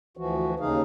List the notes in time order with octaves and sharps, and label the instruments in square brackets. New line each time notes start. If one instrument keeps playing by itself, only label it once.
[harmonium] D2 E3 F3 F#4
D#2 C#3 D#4 G#4 F5